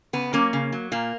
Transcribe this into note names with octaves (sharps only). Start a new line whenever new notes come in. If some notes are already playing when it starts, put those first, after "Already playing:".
C#3 B3
F#3 A#3 C#4
C#3
F#3
A#2 A#3